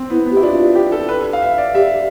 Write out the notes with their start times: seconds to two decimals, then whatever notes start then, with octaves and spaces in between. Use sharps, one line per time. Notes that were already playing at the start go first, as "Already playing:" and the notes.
Already playing: C4
0.10 B3 E4
0.26 B3
0.31 G4
0.37 E4
0.43 D4 F4
0.75 G4
0.92 A4
1.09 B4
1.33 F5
1.42 E5
1.58 D5
1.74 G4 E5